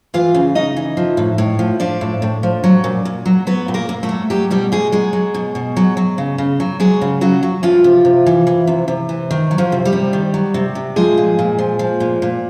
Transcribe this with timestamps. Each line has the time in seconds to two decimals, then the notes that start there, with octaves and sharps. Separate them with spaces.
0.14 E3 F4 F5
0.34 C#3
0.55 C#3 D#4 D#5
0.76 E3
0.97 F3
1.17 A2
1.38 A2
1.59 F3
1.80 F3 D4 D5
2.01 A2
2.22 A2
2.43 F3
2.64 F#3
2.84 A#2
3.05 A#2
3.26 F#3
3.47 F#3 B3 B4
3.68 A#2
3.74 A#3 A#4
3.89 A#2
4.03 A3 A4
4.09 F#3
4.30 F#3 G3 G4
4.50 B2 G3 G4
4.72 B2 G#3 G#4
4.92 F#3 G#3 G#4
5.13 F#3
5.34 B2
5.55 B2
5.77 F#3
5.97 F#3
6.18 C#3
6.38 C#3
6.60 F#3
6.80 F#3 G#3 G#4
7.01 C#3
7.21 C#3 F#3 F#4
7.43 F#3
7.63 E3 F3 F4
7.84 C3
8.05 C3
8.26 E3
8.47 E3
8.67 C3
8.88 C3
9.09 E3
9.31 D#3
9.51 F#3
9.58 F3 F4
9.72 C3
9.85 G3 G4
9.93 C3
10.13 D#3
10.34 F#3
10.54 C3
10.75 C3
10.96 F3 G#3 G#4
11.17 A#2
11.39 A#2
11.58 F3
11.79 F3
12.00 A#2
12.22 A#2